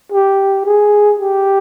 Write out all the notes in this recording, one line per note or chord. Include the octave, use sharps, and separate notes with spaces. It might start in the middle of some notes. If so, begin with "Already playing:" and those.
G4
G#4
G4